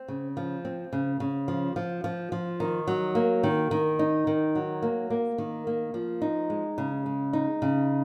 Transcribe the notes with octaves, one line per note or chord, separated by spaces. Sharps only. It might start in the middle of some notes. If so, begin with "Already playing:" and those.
Already playing: C4
C#3
F3
C4
C#3
C#3
F3
F3
F3
F3
D#3
F#3
A#3
D#3
D#3
D#4
D#3
F#3
A#3
A#3
D#3
A#3
F3
D#4
G#3
C#3
G#3
D#4
C#3